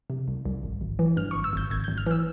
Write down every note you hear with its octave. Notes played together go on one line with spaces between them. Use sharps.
C3
C2
C2
G#1
G#1
E3
G2 F6
G#1 C#6
E6
G#1 G6
G#1 G#6
G#1 G6
F6
E3 E6